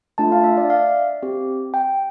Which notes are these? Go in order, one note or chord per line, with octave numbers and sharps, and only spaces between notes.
A3 D4 F4 A5
F5
E5
D5
F5
C4 G4
G5